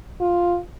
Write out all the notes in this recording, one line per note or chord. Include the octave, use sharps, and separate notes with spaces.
F4